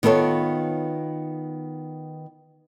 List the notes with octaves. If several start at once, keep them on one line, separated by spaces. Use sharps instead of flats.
D#3 B3 F4 A4 C#5